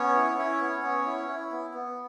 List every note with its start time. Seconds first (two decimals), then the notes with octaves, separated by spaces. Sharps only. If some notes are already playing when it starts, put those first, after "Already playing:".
Already playing: B3 C#4 C#5
0.16 E4
0.38 E4
0.60 B3
0.83 B3
1.06 E4
1.28 E4
1.52 B3
1.74 B3